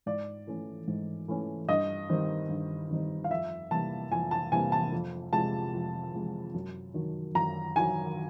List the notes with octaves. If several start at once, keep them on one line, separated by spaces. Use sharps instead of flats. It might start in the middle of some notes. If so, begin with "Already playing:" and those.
G#2 D5
E3 A3 C#4
G#2
E3 A3 C#4
G2 D#5
D#3 G3 C4 D#4
G2
D#3 G3 C4 D#4
F5
F2 E5
C3 E3 G3 A#3 A5
F2 G#5
A5
C3 E3 G3 A#3 G#5
A5
F2
C3 F3 G#3 A5
F2
C3 F3 G#3
F#2
D#3 F#3
F#2 A#5
D#3 F#3 G#5